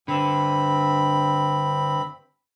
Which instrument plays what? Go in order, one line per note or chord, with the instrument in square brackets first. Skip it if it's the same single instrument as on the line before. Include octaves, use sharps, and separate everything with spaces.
[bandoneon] G2 C4 B5 [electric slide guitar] D3